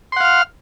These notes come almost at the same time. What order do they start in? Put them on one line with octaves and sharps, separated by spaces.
C6 F#5 F5 F6